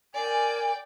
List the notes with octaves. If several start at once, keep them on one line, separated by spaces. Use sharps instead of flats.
A#4 D5 G5 G#5